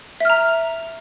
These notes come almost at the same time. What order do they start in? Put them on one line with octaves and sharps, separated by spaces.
E5 F6 A#5